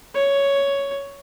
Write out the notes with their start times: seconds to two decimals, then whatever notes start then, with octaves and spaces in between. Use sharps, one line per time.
0.15 C#5